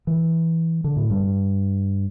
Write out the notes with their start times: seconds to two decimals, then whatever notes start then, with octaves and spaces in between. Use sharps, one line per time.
0.07 E3
0.84 D3
0.96 A2
1.10 G2